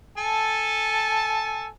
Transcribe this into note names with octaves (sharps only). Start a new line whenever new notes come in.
A4 G#5 A5